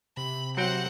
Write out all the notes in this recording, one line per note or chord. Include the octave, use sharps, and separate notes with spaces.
C3 B5
F#3 C4 F#4 C5 F#5 G5